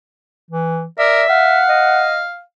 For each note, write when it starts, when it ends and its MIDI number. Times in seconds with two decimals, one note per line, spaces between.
0.51 0.85 52
0.99 1.23 70
0.99 1.27 74
0.99 1.59 76
1.29 2.41 77
1.29 2.08 78
1.69 2.24 75